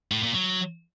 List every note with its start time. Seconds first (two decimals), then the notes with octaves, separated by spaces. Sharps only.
0.12 A2
0.23 A#2
0.35 F#3